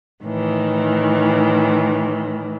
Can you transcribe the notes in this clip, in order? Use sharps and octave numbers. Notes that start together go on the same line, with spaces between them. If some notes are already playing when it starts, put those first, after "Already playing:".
A2 D#3 E3